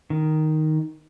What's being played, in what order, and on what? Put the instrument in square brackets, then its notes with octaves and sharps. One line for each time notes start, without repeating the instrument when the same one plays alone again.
[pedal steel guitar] D#3